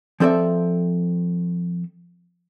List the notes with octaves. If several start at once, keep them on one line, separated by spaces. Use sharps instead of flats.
F3 C4 A4 D5 E5